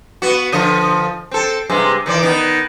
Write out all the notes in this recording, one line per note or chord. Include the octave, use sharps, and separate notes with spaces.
B3 F#4
D3 F3 D#5
C4 A4
G2 C3 G#3
D#3 E3 D5
D#3 B3 D#4